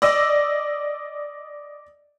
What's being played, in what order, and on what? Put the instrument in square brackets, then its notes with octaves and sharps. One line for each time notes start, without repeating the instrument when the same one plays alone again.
[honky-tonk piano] D5 D#5 E6